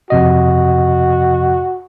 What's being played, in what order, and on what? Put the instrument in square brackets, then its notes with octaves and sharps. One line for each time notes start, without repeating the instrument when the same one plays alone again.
[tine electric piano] F2 C3 D#5 [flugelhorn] F#4